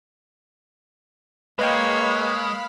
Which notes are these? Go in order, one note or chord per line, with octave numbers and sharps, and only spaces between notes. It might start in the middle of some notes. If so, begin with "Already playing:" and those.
G#3 A#3 B4 C#5 D#5 F5 G5 B5